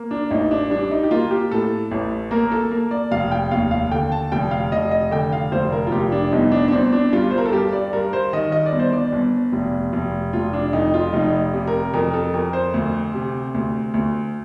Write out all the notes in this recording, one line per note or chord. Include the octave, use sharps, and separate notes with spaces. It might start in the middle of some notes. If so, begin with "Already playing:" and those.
Already playing: A#3
D4
A1 D#4
D4
G3 D4
D#4
G4
A#3 F4
G4
A2 A4
A1
A#3 A#4
A4
A#3 A#4
D5
F1 F5
G5
D#2 F5
F5
D3 G5
A5
F1 G5
F5
F1 D#5
D#5
D3 G5
F5
F1 C5
A#4
F4
F1 G4
D4
G1 D#4
D4
D4
G1 C4
D4
G2 F4
C5
A#4
A4
G2 G4
D5
G2 A#4
C5
D#3 D#5
D#5
D5
G1
C5
D5
G1
F1
F1
F1 F4
D4
F2 D#4
F4
F1 D#4
C3
A#4
F2 A#4
A4
F2 A#4
C5
D2
C3
D2
D2